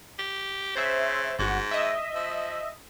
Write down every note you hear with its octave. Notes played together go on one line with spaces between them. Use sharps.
G4
C#3 C5 E5
G1 G#2 F#4
D#5 E5
F3